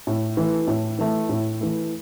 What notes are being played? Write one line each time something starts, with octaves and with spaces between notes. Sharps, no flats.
A2
E3 A3
A2
E3 A3
A2
E3 A3